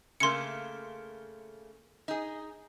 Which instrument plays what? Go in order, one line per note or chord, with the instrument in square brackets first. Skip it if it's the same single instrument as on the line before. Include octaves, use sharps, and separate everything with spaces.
[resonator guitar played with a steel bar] C#3 A3 A#3 [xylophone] C6 C#7
[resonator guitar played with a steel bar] D#4 G#4